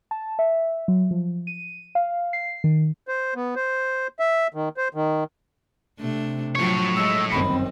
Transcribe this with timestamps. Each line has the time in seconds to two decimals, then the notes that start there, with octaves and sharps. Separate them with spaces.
0.11 A5
0.39 E5
0.88 F#3
1.11 F3
1.47 D#7
1.95 F5
2.33 C7
2.64 D#3
3.08 C5
3.35 B3
3.56 C5
4.19 E5
4.54 D#3
4.77 C5
4.94 D#3
5.99 C3 A3 D4
6.55 A2 F3 F#3 C#5
6.96 G#3 E6
7.32 G1 F#2 D#3 C4 B5